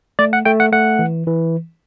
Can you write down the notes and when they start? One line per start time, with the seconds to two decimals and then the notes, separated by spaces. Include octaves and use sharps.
0.19 A3 D5
0.33 F#5
0.45 A3 G5
0.60 F#5
0.72 A3 F#5
0.99 E3
1.27 E3